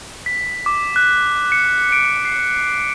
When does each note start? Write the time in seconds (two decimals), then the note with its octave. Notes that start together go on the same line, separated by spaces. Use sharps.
0.26 B6
0.66 D6
0.96 F#6
1.52 C#7
1.92 D7
2.25 C7